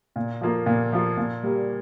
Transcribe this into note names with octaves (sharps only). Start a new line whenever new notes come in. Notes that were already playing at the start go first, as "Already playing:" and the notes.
A#2
F3 A#3 F4
A#2
F3 A#3 F4
A#2
G3 A#3